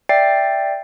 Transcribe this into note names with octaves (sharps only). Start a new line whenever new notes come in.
D5 E5 G5 A6 C7